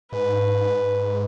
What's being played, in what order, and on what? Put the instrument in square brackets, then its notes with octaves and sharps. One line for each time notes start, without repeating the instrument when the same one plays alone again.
[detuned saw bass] G#2 [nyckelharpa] B4